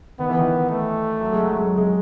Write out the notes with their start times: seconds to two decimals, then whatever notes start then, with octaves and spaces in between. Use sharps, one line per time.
0.19 D#3 B3
0.29 E3
0.39 D#3
0.70 A3
1.21 F#3
1.32 G#3
1.43 F#3
1.55 G#3
1.66 F#3
1.77 G#3